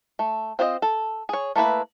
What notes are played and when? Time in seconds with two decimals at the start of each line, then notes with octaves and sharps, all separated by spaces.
0.19 A3
0.59 C4 F4 C5 D5 D#5
0.82 A4
1.29 G#4 C#5
1.56 A3 A#3 E4 B4